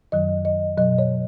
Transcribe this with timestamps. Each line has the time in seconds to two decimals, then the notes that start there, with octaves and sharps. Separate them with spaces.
0.12 F#2 D#3 F#3 D#5
0.45 D#5
0.77 B2 F#3 D#5
0.98 C#5